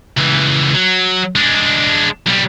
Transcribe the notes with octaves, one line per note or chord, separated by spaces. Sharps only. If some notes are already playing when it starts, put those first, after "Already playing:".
C#2 E3
F#3
G#3 D4
B1 G3